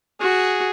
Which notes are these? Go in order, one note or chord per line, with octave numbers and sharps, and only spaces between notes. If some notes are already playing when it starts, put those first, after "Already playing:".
F#4 G#4